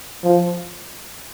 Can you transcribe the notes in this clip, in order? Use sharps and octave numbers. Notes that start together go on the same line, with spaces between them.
F3